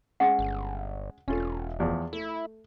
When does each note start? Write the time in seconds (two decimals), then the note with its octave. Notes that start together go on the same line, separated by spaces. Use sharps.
0.20 G#3 C#4 F#5
0.39 G1
1.28 E1 C#4 F4 A4
1.80 E2 F3
2.13 A3 E4